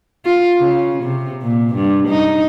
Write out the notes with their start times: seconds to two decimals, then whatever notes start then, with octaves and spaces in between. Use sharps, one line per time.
0.25 F4
0.59 C#3
1.03 C3
1.42 A#2
1.75 G2
2.08 D#4